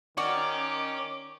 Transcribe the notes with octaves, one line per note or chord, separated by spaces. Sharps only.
D#3 C#4 F#4 D5 D6